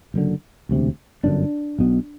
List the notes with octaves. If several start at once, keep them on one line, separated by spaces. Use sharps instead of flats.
F#1 F#2 D3
E1 D2 C3
G1 F#2 D3 D4
B1 B2